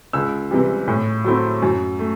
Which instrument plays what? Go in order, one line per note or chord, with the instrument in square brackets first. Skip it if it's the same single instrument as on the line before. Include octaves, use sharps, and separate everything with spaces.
[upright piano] C#2 E6
C3 E3 G3
A2
F#3 A3 C4 E4
F#2
A3